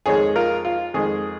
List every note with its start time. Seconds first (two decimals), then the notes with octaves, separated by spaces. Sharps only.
0.06 F2 D#3 G#3 G#4 C#5
0.35 F4 A#4
0.65 F4
0.94 F2 D#3 G#3 G#4